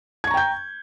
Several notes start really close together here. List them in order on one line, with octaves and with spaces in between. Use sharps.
G#6 C#6 A#5 G5 G6